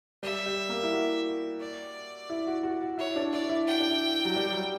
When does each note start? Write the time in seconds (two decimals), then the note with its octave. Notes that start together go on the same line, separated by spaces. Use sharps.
0.23 G3 E5
0.46 G3
0.69 A#3
0.83 E4
0.92 F#4
1.61 D5
2.30 E4
2.47 F#4
2.63 F#4
2.82 F#4
2.98 E4 C#5
3.16 D4
3.33 E4 D5
3.49 E4
3.67 F#4 G5
3.80 D4
3.89 E4
4.25 F#3
4.36 G3
4.53 F#3